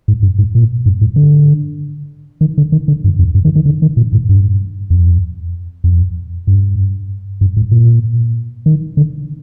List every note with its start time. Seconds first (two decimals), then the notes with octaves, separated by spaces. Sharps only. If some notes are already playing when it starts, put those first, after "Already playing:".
0.08 G#2
0.23 G2
0.39 G#2
0.55 A#2
0.86 G2
1.01 G#2
1.16 D3
2.41 D#3
2.58 D3
2.72 D#3
2.88 D3
3.04 G2
3.19 F2
3.35 G2
3.45 D#3
3.55 D#3
3.66 D3
3.82 D#3
3.97 A#2
4.12 G#2
4.29 G2
4.90 F2
5.84 F2
6.47 G2
7.41 G2
7.57 G#2
7.71 A#2
8.66 D#3
8.97 D3